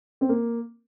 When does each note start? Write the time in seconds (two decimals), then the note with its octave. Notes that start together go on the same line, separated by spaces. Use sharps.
0.21 C4
0.29 A#3